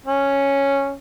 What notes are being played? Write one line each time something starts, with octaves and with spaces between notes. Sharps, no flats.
C#4